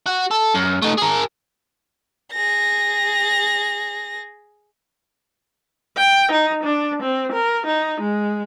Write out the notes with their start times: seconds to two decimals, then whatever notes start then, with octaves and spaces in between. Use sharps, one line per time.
0.06 F#4
0.31 A4
0.54 F#2
0.82 A3 D#4
0.98 G#4 A#4
2.33 G#4 A#6
5.97 G5
6.32 D#4
6.63 D4
7.02 C4
7.32 A#4
7.66 D#4
8.01 G#3